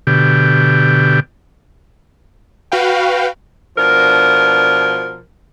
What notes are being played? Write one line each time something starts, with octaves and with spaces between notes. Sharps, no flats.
B2 D3 G4
F#4 B4 F5 G5
B2 F3 D4 A#4